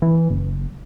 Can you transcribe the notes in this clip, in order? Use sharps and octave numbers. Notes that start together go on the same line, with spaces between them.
E3
F#1